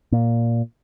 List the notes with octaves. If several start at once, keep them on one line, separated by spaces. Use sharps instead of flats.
A#2